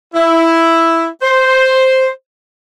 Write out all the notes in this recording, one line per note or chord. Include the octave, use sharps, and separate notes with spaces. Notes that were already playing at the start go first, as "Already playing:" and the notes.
E4
C5